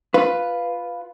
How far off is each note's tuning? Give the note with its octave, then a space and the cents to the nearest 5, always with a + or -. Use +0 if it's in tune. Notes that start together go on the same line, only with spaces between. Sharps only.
F4 +0 B4 +0